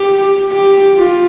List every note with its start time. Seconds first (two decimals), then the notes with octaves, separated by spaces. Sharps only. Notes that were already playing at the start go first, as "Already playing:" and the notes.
Already playing: G4
0.52 G4
0.96 F4